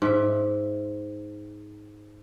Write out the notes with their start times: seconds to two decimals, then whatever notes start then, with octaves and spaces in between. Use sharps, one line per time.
0.02 G#2 E5